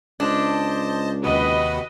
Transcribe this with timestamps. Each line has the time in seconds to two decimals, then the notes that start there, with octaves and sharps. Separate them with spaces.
0.20 C#2 D4 C5 D#5 A5
1.24 D#2 C3 F#4 B4 D#5